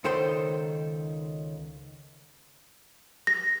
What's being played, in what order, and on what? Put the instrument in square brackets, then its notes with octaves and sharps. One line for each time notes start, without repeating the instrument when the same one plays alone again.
[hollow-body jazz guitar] C#2 D#3 A4 C5 G5 C6
[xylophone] A#6